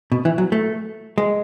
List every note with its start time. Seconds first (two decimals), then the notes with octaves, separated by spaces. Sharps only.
0.12 B2
0.25 E3
0.38 F#3
0.52 A3
1.18 G#3